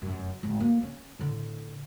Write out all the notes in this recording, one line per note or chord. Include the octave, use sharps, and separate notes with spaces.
F1 F#2
G#1 D2
D2 A#3
C#4
A2 D3